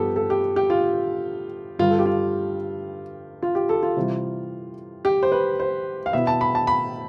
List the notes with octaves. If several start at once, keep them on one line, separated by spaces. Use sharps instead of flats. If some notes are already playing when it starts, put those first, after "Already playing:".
Already playing: G2 F3 B3 G4 A4
A4
G4
G4
F4
G2 D3 G3 F4
A4
G4
F4
F4
G4
A4
F4
C3 E3 G3
G4
C5
B4
C5
F5
B2 B3 E4 E5
A5
B5
A5
B5